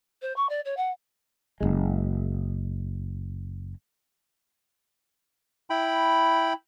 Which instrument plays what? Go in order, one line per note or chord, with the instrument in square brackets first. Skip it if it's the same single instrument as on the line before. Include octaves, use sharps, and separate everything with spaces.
[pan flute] C5
C#6
D5
C#5
F#5
[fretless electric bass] F#1 C2 G#3
[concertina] E4 G5 B5